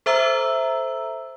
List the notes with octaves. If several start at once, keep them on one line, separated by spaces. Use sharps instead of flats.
A4 C5 E5 A#5 E6